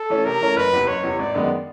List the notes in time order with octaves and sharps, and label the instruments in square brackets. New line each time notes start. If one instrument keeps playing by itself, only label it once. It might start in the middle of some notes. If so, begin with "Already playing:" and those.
Already playing: [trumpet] A4
[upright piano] E3 A3 C#4
[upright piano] C3 [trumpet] A#4
[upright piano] E3 A3 C#4
[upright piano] F#1 [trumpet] B4
[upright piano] E2 C3
[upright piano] F#1 [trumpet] C#5
[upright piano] E2 C3
[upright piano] G#1 [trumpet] D5
[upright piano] F#2 D#3 G#3 B3